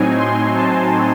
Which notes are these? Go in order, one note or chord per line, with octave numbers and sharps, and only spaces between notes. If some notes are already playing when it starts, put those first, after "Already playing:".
Already playing: A2 F#3 C4 D#4 G#5
C6
A5